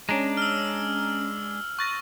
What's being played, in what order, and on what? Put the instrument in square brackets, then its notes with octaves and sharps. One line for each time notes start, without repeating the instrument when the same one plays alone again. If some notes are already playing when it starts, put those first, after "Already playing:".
[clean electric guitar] G#3 D4 [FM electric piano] C#4 A#5
[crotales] E6 F6
[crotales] C#6 [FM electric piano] F#6 A6 A#6